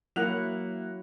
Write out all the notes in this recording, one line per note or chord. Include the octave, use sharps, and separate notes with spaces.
F#3 A#3 E4 F#5 F#6 F7